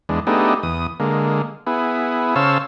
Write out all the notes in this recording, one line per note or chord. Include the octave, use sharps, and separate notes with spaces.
E2 G#3 D4
A3 B3 D4 D#4 G4 G#4
E2 D#6
D3 G#3 A#3
B3 E4 G#4
C#3 C5 C#5 F5 A5 E6